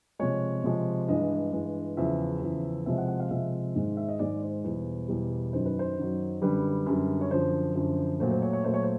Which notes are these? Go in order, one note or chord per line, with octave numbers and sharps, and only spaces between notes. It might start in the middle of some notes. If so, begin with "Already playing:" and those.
C3 F3 G#3 C#5
C3 F3 G#3
G2 E3 G#3 D#5
G2 E3 G#3
E2 C#3 F3 E5
E2 C#3 F3
C3 F3 G#3 E5
F#5
F#5
F5
C3 F3 G#3 E5
G#2 D#3 G#3
E5
D#5
G#2 D#3 G#3 D5
C5
E2 B2 G3
E2 B2 G3
F#2 D#3 F#3 C5
B4
C5
F#2 D#3 F#3
F#2 D3 G3 B4
F#2 D3 G3
C#5
F#2 D3 F3 C5
F#2 D3 F3
A#2 F#3 A3 C5
C5
C#5
C#5
A#2 F#3 A3 C5
C#5
C5